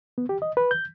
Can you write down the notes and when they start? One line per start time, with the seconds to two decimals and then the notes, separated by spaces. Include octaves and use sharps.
0.18 B3
0.29 G4
0.42 D#5
0.57 B4
0.71 G6